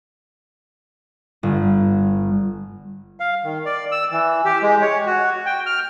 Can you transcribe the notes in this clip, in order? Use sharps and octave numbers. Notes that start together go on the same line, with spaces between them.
G1
F5
D#3
D5
E6
E3
G4
G#3
C#5
F#4
G5
F6